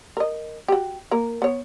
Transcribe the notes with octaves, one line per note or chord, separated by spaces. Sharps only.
A#4 D#5
F#4 G4
A#3 A#4
B3 C#5